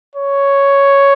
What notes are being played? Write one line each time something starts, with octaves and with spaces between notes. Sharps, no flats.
C#5